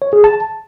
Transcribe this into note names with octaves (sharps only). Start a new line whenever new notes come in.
C#5
G#4
A5